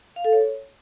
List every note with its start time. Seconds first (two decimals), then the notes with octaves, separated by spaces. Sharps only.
0.16 F5
0.25 A4
0.33 C#5